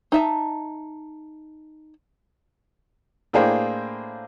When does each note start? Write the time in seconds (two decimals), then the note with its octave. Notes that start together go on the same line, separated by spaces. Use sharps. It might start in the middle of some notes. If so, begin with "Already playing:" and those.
0.12 D#4 E5 A5
3.33 A2 A#3 D4 G#4 C5 G5